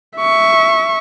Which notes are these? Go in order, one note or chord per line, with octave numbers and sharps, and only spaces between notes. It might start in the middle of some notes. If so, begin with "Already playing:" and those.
E5 C#6